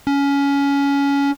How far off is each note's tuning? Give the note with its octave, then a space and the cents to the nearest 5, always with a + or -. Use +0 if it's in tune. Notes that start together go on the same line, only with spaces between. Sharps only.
C#4 +20